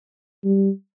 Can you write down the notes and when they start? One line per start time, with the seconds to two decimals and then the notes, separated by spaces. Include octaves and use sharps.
0.45 G3